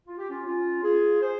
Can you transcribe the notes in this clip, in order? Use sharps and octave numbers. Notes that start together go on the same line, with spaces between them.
F4
G4
C#4 F4
C#4 F4
F4 G#4
G#4 C5